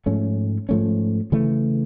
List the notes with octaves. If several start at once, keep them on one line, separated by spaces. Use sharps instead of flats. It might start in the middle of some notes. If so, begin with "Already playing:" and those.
G#2 F3 A3 C#4
G#2 F3 A3 C#4
C#3 E3 A3